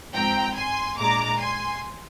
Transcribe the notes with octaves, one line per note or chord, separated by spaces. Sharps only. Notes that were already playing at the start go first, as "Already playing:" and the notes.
G#2 F3 C4 G5 A#5
G#5 C6
A#2 G#3 D4 A#5 D6
G#5 C6